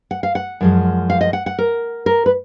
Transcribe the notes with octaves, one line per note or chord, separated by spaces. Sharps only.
F#5
F5
F#5
F#2 F3 G#3
F5
D#5
F#5
F#5
A#4
A#4
B4